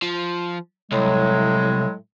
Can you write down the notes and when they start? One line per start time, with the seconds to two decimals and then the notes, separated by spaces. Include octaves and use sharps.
0.02 F3
0.92 C2 A2 F#3 G#3